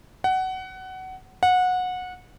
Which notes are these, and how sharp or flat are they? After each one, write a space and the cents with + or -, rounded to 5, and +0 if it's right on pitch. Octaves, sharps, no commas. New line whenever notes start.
F#5 +20
F#5 -20